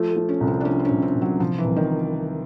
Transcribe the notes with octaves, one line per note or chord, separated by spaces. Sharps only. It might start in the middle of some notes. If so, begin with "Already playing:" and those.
Already playing: F3 A3
A3
F3
C#4
C2
C4
D4
F3 C#4
C4
C#4
C2
C4
C2
F#3
C2 F3
E3
C2
D#3